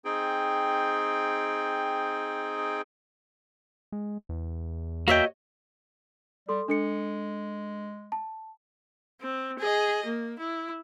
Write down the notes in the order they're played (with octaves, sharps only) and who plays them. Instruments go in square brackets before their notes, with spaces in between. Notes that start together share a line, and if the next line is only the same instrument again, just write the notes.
[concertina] C4 D#4 G#4 G5
[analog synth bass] G#3
E2
[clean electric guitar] A#3 E5 G5 [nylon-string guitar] F#4 C#5 D#5
[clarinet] G3 [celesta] A4 C6
[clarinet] G#3 [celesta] D4 A4 C#7
[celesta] A5
[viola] C4
G#4 D#5
A#3
E4